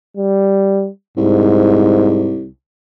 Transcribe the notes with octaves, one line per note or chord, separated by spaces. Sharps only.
G3
C2 G#2